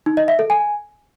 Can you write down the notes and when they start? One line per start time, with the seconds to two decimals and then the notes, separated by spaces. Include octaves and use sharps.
0.06 D#4
0.17 D#5
0.28 E5
0.39 A4
0.50 G#5